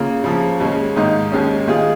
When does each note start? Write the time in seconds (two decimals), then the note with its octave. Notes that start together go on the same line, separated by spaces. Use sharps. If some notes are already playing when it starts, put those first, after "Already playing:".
Already playing: C#3 A#3 F4
0.24 C#3 F3 A#3
0.60 D#2 C#3 G#3 C#4
0.96 G#2 D#3 A#3 D#4
1.32 D#2 D#3 G#3 C#4
1.67 D#3 G#3 F4 G#4